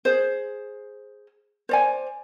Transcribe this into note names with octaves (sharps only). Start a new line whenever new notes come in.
G#4 C5
C5 D5 G#5